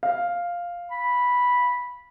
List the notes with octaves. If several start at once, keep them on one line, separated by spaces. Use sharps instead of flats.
F5
B5